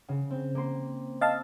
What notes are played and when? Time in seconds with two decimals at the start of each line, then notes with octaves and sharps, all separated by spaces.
0.09 C#3
0.31 C4
0.55 A#3 C6
1.21 D#5 F5 A5 E6 A6